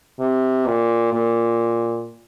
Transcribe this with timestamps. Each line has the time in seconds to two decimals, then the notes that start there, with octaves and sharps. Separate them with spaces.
0.20 C3
0.67 A#2
1.13 A#2